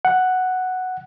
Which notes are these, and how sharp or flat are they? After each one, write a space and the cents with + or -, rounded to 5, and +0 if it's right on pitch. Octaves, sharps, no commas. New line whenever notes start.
F#5 +0